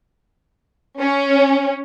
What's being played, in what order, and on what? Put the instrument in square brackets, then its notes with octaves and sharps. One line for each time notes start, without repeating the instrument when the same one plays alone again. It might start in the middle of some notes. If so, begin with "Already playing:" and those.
[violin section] C#4